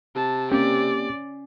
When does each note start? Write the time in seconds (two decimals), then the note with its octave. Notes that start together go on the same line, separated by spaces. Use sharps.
0.16 C3 A5
0.52 A#3 C4 C#4 G4 D5